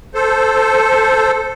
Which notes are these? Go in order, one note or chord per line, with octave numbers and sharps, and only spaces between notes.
A4 C5